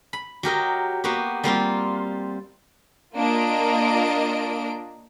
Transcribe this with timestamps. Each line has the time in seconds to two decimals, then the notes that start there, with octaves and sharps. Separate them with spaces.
0.13 B5
0.43 F#3 G4 A#4 D#5
1.04 A#3 B3 F#4 G4
1.44 G3 A#3 C4 F4
3.15 A#3 D4 F4 A#4 D#5 D7